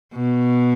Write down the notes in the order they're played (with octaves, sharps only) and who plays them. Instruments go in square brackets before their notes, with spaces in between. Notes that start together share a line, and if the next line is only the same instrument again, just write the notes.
[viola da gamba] B2